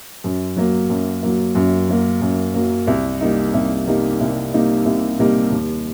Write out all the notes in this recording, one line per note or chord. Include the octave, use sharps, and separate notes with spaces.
F#2
F#3 A#3
F#2
F#3 A#3
F#2
F#3 A#3
F#2
F#3 A#3
C2
C3 G3 A#3 D#4
C2
C3 G3 A#3 D#4
C2
C3 G3 A#3 D#4
C2
C3 G3 A#3 D#4
D#2